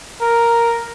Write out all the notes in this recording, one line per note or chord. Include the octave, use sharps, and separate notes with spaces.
A#4